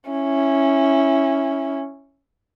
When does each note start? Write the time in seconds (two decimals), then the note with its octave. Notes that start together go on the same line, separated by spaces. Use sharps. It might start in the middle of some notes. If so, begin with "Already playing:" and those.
0.10 C#4 E4